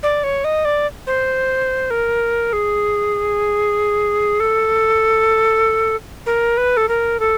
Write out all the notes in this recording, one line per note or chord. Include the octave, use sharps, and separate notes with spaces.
D5
C#5
D#5
D5
C5
A#4
G#4
A4
A#4
B4
A4
A#4
A4